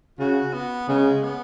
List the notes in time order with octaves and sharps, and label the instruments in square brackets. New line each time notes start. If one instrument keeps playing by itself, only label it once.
[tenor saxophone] C#3 [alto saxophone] F#4
[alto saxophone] B3
[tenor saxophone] C#3 [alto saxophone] G#3
[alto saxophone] B3